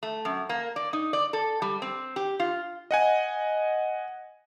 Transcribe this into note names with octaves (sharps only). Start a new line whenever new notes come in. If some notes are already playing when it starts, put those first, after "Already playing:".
A3
F#2
A#3
D5
D#4
D5
A4
G3
C4
G4
F4
D#5 F#5 G#5